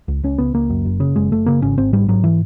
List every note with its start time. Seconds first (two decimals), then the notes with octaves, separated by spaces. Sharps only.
0.08 C#2
0.24 C#2 C#4
0.38 C#2 B3
0.54 C#2 A#3
0.70 F#2
0.85 F#1
1.00 C#3
1.16 F#1 G#3
1.32 F#1 A3
1.46 C#3 A#3
1.62 G#1 C#4
1.78 G#1 C4
1.93 G#2 G3
2.08 G#2 F#3
2.24 E3